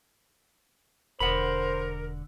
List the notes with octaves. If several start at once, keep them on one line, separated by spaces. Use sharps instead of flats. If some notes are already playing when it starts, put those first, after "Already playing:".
E1 D3 A#4 C5 F#5 B5